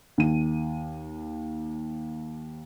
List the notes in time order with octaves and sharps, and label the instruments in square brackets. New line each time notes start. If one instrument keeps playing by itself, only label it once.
[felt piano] D#2 D#7